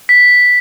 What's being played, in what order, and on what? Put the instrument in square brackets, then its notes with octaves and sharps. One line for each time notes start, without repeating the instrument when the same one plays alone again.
[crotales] B6